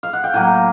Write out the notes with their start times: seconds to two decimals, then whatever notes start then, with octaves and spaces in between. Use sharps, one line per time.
0.03 F5
0.13 F#5
0.24 G5
0.34 A2 F#3 A#3 G#5